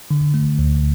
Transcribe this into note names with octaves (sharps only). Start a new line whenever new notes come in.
D3
A3
D2